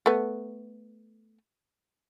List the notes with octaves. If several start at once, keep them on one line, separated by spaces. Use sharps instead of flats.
A3 B3